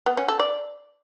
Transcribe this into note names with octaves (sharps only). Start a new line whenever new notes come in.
B3
C#4
A4
D5